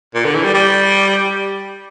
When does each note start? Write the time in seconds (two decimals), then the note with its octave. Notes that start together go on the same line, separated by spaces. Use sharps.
0.15 A#2
0.25 D3
0.35 E3
0.44 G3
0.54 G3